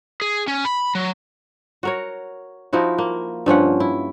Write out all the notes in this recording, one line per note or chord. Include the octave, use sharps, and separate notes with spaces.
G#4
C#4
B5
F#3
F#4 A#4 C#5
F3 D#4 E4 F#4
A#3
G2 F3 C#4 F#5
E4